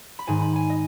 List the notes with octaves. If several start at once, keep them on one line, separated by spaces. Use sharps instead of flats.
B5
G#2 D#3 G#5
B5
G#5
D#5